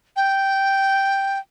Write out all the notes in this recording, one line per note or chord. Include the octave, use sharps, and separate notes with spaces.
G5